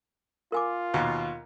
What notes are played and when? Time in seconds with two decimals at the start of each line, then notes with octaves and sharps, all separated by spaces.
0.52 F4 A#4 G#5 D6
0.94 D#2 B2